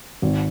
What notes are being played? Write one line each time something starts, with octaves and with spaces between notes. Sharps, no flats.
G#1